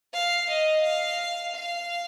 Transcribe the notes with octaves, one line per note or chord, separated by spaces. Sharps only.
F5
D#5
F5
F5